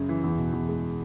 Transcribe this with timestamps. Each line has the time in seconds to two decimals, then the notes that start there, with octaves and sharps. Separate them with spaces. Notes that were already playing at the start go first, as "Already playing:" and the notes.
Already playing: F#2 C#3
0.09 E3
0.24 E2
0.38 B2
0.53 E2
0.69 G#3